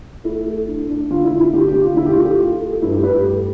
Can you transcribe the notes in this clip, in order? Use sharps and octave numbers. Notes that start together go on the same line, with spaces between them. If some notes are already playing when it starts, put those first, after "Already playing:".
A3 E4
A3
D4
D4
D3 F4
E4
D3
E4
D3 G4
G4
D3
F4
D3 E4
G4
F4
A3
G4
A3 F4
A3
G2 E4
G4
G2 B4
G4
A3